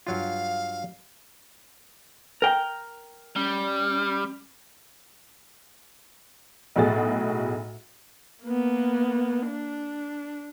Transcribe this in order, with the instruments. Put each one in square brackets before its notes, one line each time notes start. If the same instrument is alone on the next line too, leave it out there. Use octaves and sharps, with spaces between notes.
[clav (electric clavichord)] G2 F#3 F4 [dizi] F5
[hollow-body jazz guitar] A#4 G5
[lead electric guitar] G3 [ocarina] C#4
[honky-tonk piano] B1 A2 F#4 G#4 A6
[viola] A#3 B3
D4